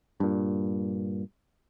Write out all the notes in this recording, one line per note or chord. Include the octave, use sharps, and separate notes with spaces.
G2 A#2